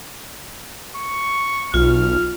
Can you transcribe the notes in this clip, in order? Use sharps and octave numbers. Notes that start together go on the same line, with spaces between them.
C#6
B1 F4 F6